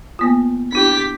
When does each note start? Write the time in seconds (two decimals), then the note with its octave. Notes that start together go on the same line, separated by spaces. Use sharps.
0.19 A#3 B3 F4
0.72 D4 E4 G4 B6